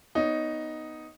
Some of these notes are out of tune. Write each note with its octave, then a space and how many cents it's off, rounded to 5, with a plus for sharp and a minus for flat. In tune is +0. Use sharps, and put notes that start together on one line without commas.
B3 +0 D#4 +0 C#5 +15